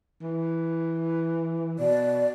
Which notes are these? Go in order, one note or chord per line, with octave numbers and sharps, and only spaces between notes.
E3
B2 D5